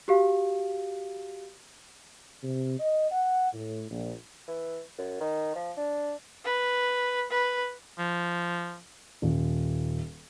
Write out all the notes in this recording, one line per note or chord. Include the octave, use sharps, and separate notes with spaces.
F#4 G4 F5
C3
D#5
F#5
A2
A#1
E3
F#2
D#3
F3
D4
B4
B4
F3
D#1